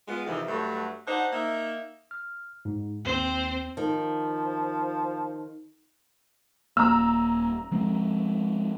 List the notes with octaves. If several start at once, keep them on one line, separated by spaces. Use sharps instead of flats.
G#3 B3 F4
F2 C3 D#3 E3
G2 F#3 A3 F#4
D4 D#4 C5 F#5
A#3 D#4 E5
F6
G#2
D#2 C4 C5
D#3 F3
D#1 A#3 A#5 E6
F3 G#3 C4